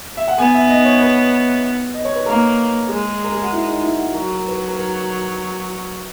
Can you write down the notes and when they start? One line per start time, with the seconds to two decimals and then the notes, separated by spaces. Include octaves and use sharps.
0.17 E5
0.28 F#5
0.38 B3 G#5
0.54 E5
0.69 D#5
0.85 C#5
1.02 B4
1.94 D#5
2.05 C#5
2.16 B4
2.26 A#3 A#4
2.88 G#3 G#4
3.24 A#4
3.33 G#4
3.42 F#4
3.52 E4
3.67 D#4
3.83 E4
3.99 F#4
4.14 F#3 A#4
4.34 A#4
4.48 B4
4.56 A#4
4.68 A#4
4.76 B4